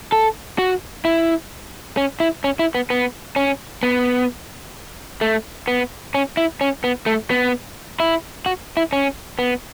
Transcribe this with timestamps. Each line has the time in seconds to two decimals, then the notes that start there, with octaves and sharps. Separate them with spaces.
0.12 A4
0.58 F#4
1.05 E4
1.97 C#4
2.20 E4
2.44 C#4
2.59 E4
2.75 B3
2.90 B3
3.36 C#4
3.83 B3
5.21 A3
5.68 B3
6.14 C#4
6.37 E4
6.61 C#4
6.84 B3
7.06 A3
7.30 B3
8.00 E4
8.46 F#4
8.77 E4
8.93 C#4
9.39 B3